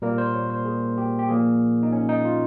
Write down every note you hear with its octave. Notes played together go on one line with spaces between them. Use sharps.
A#2 G3 A#3 A#4
C5
C#5
C5
G#4
G4
G4
A#2 F3 A#3 G#4
D#4
C#4
D#4
F4